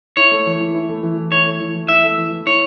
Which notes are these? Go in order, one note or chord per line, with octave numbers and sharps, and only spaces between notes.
E4 C#5
A3
E3
E3
E4
A3
E3
E3
E4 C#5
A3
E3
E3
E4 E5
A3
E3
E3
E4 C#5